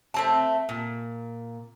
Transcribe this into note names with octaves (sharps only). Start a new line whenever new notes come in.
A3 C4 A5
A#2